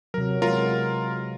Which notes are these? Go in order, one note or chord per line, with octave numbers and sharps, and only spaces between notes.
C3 F#3 A#4
G#3 B3 F4 A#4